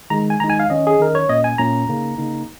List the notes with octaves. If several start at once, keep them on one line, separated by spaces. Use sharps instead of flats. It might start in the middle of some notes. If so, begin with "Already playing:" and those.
D#3 G#3 D#4 A#5
G#5
D#3 G#3 D#4 A#5
G#5
F5
D#3 C#4 D#5
G#4
D#3 C#4 A#4
C#5
A#2 A#3 C#4 D#5
G#5
A#2 A#3 C#4 A#5
C#3 A#3 D#4
C#3 A#3 D#4